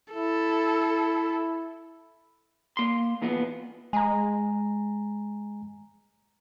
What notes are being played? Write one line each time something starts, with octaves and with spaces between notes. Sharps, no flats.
E4 A4
A#3 C6
E2 A#2 F3 B3
G#3 G#5 A#5